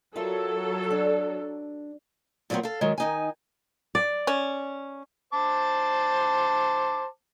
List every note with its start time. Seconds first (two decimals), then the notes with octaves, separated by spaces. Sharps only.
0.16 F#3 F4 A4 A#4 E5
0.91 D4
2.50 A#2 F#3 G#3 B3 C4
2.63 A4 F5
2.81 D#3 F#3 G#3
2.98 D#3 D#4 G#5
3.95 D5
4.27 C#4
5.33 C5 A5 D6